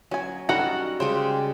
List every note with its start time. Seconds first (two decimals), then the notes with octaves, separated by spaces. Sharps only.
0.11 F#3 C#4 G#5
0.49 G3 C#4 D#4 F#4 A4 F#5 A#5
1.00 C#3 G3 G#3 G4 C5